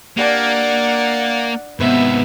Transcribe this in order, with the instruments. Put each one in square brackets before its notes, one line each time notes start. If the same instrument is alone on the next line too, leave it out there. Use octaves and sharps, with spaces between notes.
[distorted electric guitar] A#3 [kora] D4 G4 [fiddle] D5 F#5
[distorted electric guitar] G#2 C3 [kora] D#3 B4 C5 [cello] B3 [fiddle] E5